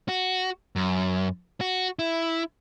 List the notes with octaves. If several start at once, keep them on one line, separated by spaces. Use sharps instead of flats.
F#4
F#2
F#4
E4